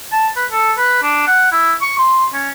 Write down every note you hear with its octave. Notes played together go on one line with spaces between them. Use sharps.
A5
B4
A4
B4
D4
F#5
E4
C#6
C6
C#4